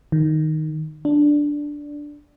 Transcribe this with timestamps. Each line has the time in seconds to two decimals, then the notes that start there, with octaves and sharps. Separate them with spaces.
0.12 D#3
1.05 D4